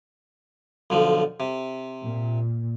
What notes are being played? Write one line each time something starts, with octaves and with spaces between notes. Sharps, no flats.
B1 D3 F3
C3
A#2